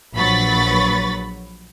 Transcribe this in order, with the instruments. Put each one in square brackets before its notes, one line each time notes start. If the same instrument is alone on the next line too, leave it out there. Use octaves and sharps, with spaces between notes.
[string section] A#1 F#3 B4 B5 C#6 A6